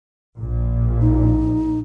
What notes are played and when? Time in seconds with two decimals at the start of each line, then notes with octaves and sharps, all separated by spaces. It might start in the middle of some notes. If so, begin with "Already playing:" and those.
0.38 A#1 A#2
1.01 D#4